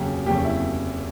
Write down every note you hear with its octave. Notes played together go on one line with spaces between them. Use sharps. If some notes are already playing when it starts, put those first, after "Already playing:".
Already playing: F1 D#2 C#3 F#3 G4
F1 D#2 C#3 F#3 G4
E4